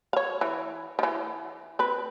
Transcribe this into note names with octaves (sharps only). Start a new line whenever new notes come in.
C#5 F5
E3
D#3 E3
C4 B4